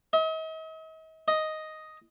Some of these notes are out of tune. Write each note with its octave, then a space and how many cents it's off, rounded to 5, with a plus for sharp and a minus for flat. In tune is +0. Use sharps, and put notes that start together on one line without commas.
D#5 +45
D#5 +5